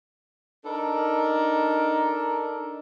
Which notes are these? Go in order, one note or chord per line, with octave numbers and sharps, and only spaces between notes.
D4 D#4 A4 A#4